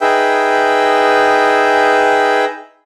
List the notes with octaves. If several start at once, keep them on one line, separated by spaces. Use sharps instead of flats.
D#4 G#4 B4 E5 G5